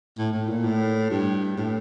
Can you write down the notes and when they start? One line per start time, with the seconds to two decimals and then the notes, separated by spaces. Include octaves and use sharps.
0.18 A2
0.33 A2
0.49 A#2
0.64 A2
1.10 G2
1.57 A2